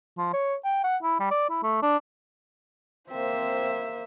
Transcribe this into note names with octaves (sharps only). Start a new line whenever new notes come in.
F3
C#5
G5
F#5
E4
G3
D5
E4
A3
D4
A#3 C4 C5 E5